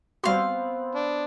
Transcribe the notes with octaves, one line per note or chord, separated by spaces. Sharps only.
G3 B3 C4 F#4 F5 C6
D4